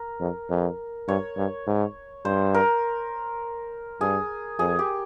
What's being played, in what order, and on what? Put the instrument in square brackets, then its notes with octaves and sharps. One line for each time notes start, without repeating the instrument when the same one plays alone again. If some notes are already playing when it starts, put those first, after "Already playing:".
Already playing: [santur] A#4
[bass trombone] F2
F2
[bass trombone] G2 [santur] C#5
[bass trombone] G2
G#2
[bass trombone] G2 [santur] C5
[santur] A#4
[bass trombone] G2 [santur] G#4
[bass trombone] F2 [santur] G#4
[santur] G4